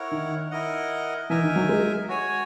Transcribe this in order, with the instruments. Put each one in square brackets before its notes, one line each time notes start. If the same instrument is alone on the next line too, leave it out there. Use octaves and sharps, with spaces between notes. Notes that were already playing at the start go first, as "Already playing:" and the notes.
Already playing: [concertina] E4 A#4 C#5 F#5
[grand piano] D#3
[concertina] E4 A#4 D#5 F#5
[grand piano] E3 [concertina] D#4 A#4 E5 G#5
[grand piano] D#3
F#3
G#3
[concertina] F#4 C#5 G#5